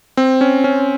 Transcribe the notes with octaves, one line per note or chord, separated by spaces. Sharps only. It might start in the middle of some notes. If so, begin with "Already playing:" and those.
C4
C#4
C#4